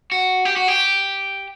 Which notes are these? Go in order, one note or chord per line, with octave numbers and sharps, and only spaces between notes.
F#4
G4
F#4
G4